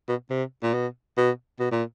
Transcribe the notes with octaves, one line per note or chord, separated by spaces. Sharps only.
B2
C3
A#2
B2
B2
B2
A#2